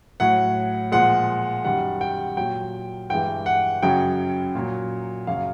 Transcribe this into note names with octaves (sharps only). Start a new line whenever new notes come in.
A2 F#3 F#5
A#2 F3 G#3 F#5
F#2 D#3 G3 F#5
G5
A#2 F#3 G5
G2 E3 G#3 G5
F#5
F#2 C#3 F#3 G5
A#2 F#3
F#2 C#3 F#3 F5